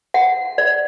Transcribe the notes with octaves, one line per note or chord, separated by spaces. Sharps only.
F#5
D5